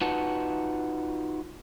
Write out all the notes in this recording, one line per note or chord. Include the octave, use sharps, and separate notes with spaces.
D#4 F4 F#4 B4 F#5 A5